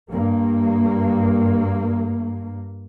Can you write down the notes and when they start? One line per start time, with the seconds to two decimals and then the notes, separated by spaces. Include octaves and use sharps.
0.11 G2 A#3